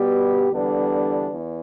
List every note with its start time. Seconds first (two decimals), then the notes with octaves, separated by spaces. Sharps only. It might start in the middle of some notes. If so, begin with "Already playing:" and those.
Already playing: B2 G3 B3 G4
0.51 E2 D3 G3 B3 D4
1.32 E2